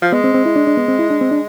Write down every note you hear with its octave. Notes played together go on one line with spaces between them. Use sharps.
F3
G#3 B3
C4
C4
E4
D4
D4
B3
C4
E4
D4
C4
D4